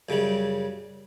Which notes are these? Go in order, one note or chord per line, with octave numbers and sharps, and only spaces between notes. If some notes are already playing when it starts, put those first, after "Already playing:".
F#2 C#3 G3